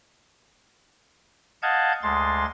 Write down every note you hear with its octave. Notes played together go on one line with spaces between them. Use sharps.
D#5 F5 F#5 A5 G6 G#6
D2 G#3 C6 A6